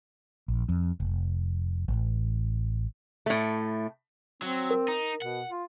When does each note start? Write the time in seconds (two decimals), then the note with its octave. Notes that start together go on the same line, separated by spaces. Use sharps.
0.48 A#1
0.69 F2
1.00 F1
1.88 A1
3.26 A2 A3
4.42 F#3 C4
4.71 A#4
4.88 D#4
5.22 B2 F#5
5.50 F4